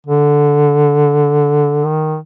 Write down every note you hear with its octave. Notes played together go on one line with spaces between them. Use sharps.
D3
D#3